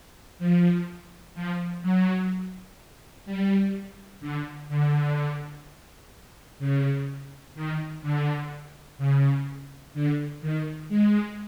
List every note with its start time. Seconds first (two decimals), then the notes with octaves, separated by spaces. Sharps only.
0.39 F3
1.35 F3
1.82 F#3
3.26 G3
4.21 D3
4.69 D3
6.59 C#3
7.55 D#3
8.02 D3
8.98 C#3
9.94 D3
10.41 D#3
10.89 G#3